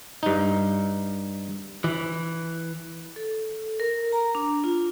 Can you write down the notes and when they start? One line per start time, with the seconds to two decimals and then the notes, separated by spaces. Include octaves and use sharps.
0.23 G2 D#4
1.84 E3
3.16 A4
3.80 A#4
4.12 A#5
4.35 D4
4.64 F4